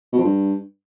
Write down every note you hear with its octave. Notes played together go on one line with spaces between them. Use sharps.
B2
F2
G2